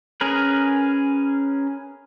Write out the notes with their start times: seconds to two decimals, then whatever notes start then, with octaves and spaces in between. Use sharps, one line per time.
0.21 C#4 G#4 A#4 B4